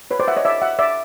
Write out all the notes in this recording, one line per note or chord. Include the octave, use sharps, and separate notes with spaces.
B4 C#5
C5 D5
E5 F#5
C#5 D#5
D5 E5
E5 F#5
D5 E5